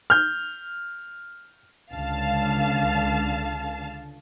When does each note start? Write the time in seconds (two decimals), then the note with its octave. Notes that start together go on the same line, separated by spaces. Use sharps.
0.10 F6 G6
1.94 C#2 D3 F5 A5